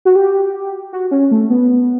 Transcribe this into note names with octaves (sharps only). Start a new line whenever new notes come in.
F#4
G4
F#4
C#4
A3
B3